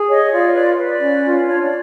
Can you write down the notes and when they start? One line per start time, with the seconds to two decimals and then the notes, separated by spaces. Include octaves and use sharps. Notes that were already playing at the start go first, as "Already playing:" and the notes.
Already playing: G#4
0.09 C#5 D#5
0.32 F4 D5
0.54 B4 D5
0.78 B4
0.85 D5
1.00 C#4
1.23 F4
1.46 D4 C#5
1.62 D5